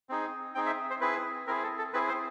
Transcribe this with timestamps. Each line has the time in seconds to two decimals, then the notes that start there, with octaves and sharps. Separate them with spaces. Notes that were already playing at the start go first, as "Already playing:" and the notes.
0.09 C4 D#4 G#4
0.55 C4 D#4 G#4 G5
0.66 E5
0.90 C5
1.01 C4 E4 G#4 B4
1.47 C4 E4 G#4 A#4
1.63 A4
1.78 A4
1.93 C4 E4 G#4 B4
2.08 C5